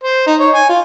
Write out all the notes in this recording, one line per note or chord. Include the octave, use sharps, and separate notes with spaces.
C5
D#4
C#5
G#5
F4